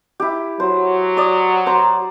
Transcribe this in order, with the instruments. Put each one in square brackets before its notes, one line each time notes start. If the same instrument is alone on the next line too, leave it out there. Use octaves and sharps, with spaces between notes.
[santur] E4 G4
[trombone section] F#3 [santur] C5
[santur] D5 D#6
C5 A#5